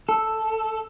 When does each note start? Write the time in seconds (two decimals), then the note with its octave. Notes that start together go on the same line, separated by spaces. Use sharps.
0.09 A4